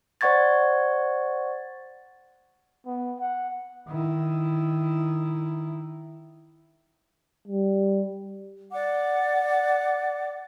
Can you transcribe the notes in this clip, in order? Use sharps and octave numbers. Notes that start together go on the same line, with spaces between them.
C5 D5 F#5 C#6 G#6 A6
B3
F#5
D#3 E4
G3
D5 F#5 D6